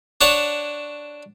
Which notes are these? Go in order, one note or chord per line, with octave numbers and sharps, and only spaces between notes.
D4 C#5 F#5 A5